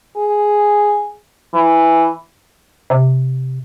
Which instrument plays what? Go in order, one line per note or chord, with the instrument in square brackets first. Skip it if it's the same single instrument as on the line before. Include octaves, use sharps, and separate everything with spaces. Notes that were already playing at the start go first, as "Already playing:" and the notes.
[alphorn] G#4
E3
[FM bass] C3